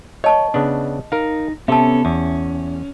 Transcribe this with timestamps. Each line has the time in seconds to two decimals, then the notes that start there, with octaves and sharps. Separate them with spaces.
0.24 C#5 D#5 A5 C#6
0.54 C#3 B3 D4
1.12 D#4 A#4 F5
1.68 C3 B3 C#4 A4 E5 A5
2.05 E2 C#4